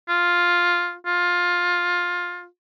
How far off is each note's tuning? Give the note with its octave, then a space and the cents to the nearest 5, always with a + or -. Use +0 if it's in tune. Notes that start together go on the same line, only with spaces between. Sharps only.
F4 +5
F4 +15